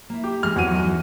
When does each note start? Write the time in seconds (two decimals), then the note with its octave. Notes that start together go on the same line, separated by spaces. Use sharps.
0.10 A#3 E4
0.24 G4
0.43 E3 G#3 G#4 F6
0.56 E2 F#3 C4 F#4 D5 D#7
0.71 F#3 D#4 A4
0.84 G2 E3